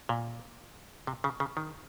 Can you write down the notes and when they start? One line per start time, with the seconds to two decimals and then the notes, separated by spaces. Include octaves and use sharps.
0.09 A#2
1.07 C3
1.24 C#3
1.40 C#3
1.57 D#3